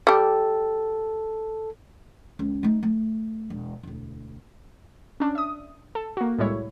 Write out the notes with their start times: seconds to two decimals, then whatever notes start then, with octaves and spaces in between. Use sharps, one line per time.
0.07 G3 G4 A4
2.39 C#2
2.63 A3 D#4
2.83 A3
3.50 E1
3.83 E1 D2
5.20 C#4 D4
5.35 E5 D#6
5.95 A4
6.17 A#3 F#4
6.38 C2 A2 G3 G#3 E4 C#5